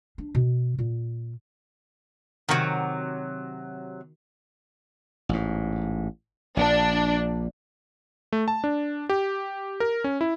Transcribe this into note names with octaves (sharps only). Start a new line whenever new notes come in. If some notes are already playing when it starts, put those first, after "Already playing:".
D4
B2
A#2
C3 D#3 F#3 F#4
A1 G#2
A#1 A#2 D4
A3
A5
D4
G4
A#4
C#4
E4